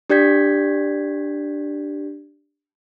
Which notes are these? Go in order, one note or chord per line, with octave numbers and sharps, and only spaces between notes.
D4 G4 D5 G6 G#6 B6